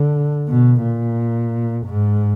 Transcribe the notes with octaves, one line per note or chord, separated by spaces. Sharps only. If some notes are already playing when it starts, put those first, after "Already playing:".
Already playing: D3
B2
A#2
G#2